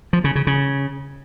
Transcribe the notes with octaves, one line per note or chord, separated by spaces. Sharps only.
F3
C#3
C#3
C#3